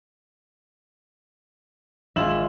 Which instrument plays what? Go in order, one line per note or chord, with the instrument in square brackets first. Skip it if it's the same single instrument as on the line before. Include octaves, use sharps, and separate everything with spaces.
[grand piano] G#1 E7 F#7 [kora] G#3 F4 E5